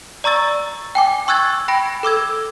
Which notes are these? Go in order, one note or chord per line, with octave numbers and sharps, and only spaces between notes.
D5 A#5 C#6 E6 A6
G5 G#5 D6
G#5 C#6 E6 F#6 G#6 A6
G5 B5 A#6 D7
A4 D6 E6 G#6